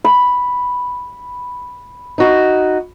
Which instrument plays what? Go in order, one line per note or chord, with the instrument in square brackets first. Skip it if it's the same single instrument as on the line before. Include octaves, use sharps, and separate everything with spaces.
[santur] B5
[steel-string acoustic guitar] D#4 F#4